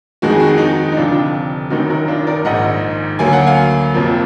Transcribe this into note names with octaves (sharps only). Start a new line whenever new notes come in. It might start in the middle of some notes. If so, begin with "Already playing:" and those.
F2 D#3 G#3 F#4
G#4
F#4
G#4
D#4 F#4
D#4
F1 F2 D3 D4 F4
F#1 F#2 D#3 D#4 F#4
F#4 A#4
D4 F4
A#4 D5
A#1 G#2 D#3 D#5 F#5
D2 D3 F#3 A#3 G#5
F#5
F5 G#5
F1 F2 F3 A#3